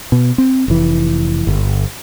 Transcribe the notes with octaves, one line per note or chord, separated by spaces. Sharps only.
B2
C4
F1 E3
G1